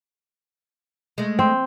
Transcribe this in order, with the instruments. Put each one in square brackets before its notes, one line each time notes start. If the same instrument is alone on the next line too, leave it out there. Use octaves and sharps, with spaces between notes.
[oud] G#3 A3
[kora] C4